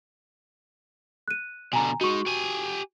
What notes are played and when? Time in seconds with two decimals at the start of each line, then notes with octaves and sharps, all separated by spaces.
1.28 F#6 D#7
1.73 B2 D3 G#5 A#5
2.01 G#3 D#4 F#4 C#6
2.26 G4 G#5